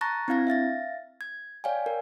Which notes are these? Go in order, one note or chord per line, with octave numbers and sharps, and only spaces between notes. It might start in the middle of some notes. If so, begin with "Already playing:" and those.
A5 A#5 C#6 F#6 A6 A#6
C4 D4 E4 F5 G#6 A#6
E5 F5 A6 A#6
G#6
C#5 D5 F5 G5 G#5
A#4